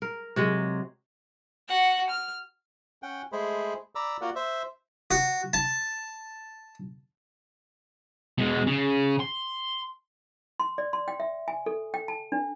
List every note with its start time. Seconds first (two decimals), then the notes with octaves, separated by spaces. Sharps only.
0.02 A#4
0.36 C3 F#3 G#3
1.69 F#4 F#5
2.10 F6
3.03 C#4 F#5 G5
3.32 G#3 A3 G#4 C5 B5
3.95 D5 A#5 B5 D6 E6
4.21 A#3 F4 F#4 A#4 D5 F#5
4.36 C5 E5
5.11 F#4
5.53 A5
8.38 B2 G#3
8.67 C#3
9.20 C6
10.60 C6
10.78 D5
10.93 C6
11.08 G5
11.20 E5
11.48 G#5
11.66 A4
11.94 G5
12.08 A5
12.32 D4